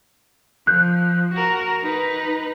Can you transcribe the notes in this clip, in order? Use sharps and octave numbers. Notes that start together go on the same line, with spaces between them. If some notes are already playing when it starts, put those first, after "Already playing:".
F3 F#6 G6
F#4 A#4
D#4 B4